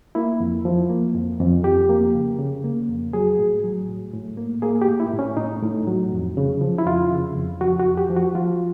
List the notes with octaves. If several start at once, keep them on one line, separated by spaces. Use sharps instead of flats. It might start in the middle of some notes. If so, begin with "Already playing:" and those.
A#3 E4
F2
F3
A#3
F2
F2
F2 G4
A#3
C#3
C#3
A#3
F2
F#3 G#4
A2
F#3
A2
A2
A#3
A#3 G#4
G4
A2
E4
A2
C#4
A2 D#4
A2
F#3
F2
C#3
F3
E4
F2 F4
C#3
F2
F3 F#4
F#4
F2
G4
F3
F#4
F3 F4